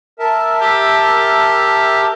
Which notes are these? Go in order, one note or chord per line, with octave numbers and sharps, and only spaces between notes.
A#4 E5 A5
G4